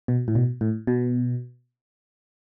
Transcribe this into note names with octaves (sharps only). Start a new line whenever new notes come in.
B2
A2
B2
A2
B2